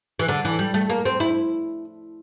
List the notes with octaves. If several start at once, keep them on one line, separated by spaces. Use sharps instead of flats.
E3
D3
E3
G3
A3
A#3
C4
E4